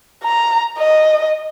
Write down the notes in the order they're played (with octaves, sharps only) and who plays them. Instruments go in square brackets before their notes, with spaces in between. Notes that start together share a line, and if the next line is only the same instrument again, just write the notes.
[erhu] A#5
D#5